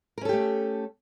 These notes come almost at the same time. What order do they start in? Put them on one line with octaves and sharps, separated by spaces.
A#4 C#4 A4 G4 A3